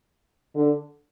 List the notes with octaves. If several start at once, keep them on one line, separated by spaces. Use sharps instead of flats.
D3